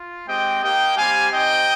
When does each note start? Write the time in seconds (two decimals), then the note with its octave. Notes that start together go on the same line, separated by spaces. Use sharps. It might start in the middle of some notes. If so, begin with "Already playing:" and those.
Already playing: F4
0.28 G#3 C4 G4 D#5 G5
0.62 A#3 D#4 G4 D#5 G5
0.97 G3 C4 G4 F5 G#5
1.31 C4 D#4 G4 D#5 G5